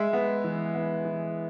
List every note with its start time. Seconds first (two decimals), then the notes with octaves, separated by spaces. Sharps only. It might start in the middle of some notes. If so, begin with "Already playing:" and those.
Already playing: G#3 E5
0.13 B3
0.44 E3
0.74 B3
1.05 E3